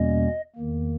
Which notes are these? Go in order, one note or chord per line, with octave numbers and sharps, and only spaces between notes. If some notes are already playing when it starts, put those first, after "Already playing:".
Already playing: E2 B2 G3 A#3 C#4 D#5
E2 D#3 A#3